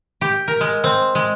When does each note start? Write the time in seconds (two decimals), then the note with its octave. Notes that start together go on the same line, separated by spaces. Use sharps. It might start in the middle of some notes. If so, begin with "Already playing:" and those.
0.21 G4
0.48 A#4
0.61 G#3
0.84 C4
1.15 G#3